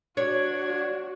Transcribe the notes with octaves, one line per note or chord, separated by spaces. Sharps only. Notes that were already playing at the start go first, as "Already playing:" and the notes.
D4 F#4 C#5 G#6